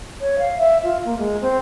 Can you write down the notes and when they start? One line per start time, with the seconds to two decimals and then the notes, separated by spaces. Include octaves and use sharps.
0.21 C#5
0.39 F5
0.58 E5
0.84 F4
1.05 A#3
1.18 G#3
1.41 C4